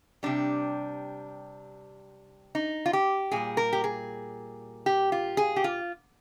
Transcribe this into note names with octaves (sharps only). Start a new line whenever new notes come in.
C3 G3 D4
D#4
F4
G4
A#2 G3 G#4
A#4
G4
G#4
G4
F4
G#4
G4
F4